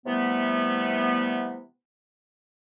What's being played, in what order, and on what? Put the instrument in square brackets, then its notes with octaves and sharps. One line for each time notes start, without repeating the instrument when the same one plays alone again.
[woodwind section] C3 E3 G3 A3 B3